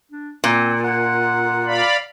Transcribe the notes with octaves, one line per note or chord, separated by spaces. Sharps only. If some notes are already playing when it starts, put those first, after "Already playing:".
D4
A#2 C4
F#5
D5 F5 B5